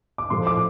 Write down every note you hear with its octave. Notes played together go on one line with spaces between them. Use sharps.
D6
A2 F3 A3 C6
D6